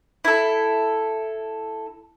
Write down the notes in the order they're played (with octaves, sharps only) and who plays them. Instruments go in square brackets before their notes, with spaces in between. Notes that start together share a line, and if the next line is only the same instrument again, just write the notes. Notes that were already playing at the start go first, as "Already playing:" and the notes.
[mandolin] E4 A4